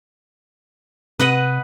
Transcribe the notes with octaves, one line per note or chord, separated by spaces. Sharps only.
C3 B4 D#5 F#5